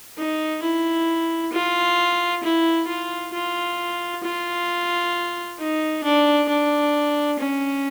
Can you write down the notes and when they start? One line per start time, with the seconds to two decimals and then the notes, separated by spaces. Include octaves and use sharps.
0.17 D#4
0.63 E4
1.52 F4
2.43 E4
2.87 F4
3.33 F4
4.23 F4
5.58 D#4
6.03 D4
6.49 D4
7.39 C#4